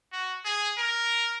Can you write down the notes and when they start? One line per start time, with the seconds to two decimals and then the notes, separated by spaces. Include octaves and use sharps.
0.12 F#4
0.45 G#4
0.78 A#4